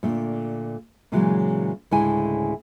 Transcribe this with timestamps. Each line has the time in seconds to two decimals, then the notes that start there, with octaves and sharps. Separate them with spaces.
0.03 A#2 D3 A3
1.12 A#2 C#3 E3 F#3 G#3
1.91 D2 A2 C#3 G#3 E4 G#5